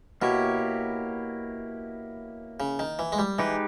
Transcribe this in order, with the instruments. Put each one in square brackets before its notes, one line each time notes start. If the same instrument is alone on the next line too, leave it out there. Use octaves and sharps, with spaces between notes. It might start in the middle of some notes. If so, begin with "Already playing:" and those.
[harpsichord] B2 [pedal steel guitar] A#3 E4 G4 C#5
[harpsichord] C#3
D#3
E3
G#3
G3
[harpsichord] E3 [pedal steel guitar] G#3 D#4 G4 B4